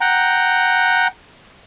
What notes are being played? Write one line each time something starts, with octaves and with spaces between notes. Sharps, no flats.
F#5 G5 A#5